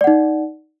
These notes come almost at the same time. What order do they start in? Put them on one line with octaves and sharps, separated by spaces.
D5 F#5 D#4